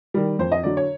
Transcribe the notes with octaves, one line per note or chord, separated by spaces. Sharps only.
D#3 G3
F2 C5
D#5
D3 F#3 D5
C#5